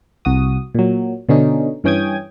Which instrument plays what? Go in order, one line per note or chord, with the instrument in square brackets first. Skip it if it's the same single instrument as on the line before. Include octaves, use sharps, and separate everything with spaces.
[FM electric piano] C2 F#4 D#6
A#2 F#3
B2 D3 C#4 D#4
G2 E3 C#4 G5 D#6 G#6